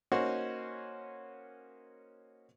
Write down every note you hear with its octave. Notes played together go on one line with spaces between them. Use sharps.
A#3 C#4 D#4 F#4 C5